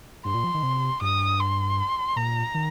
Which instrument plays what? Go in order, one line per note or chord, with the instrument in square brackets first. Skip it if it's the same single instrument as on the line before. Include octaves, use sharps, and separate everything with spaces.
[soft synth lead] G2 [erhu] C6
[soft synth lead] A#2
F3
D#3
C3
[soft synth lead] G2 [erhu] D#6
[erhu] C6
[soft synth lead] A#2 [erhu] A#5
[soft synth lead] D#3